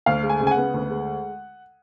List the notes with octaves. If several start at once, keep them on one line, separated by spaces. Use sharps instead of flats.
D2 F5
G#3
G#5
C#3
G#5
F#5
B3
D2
G#3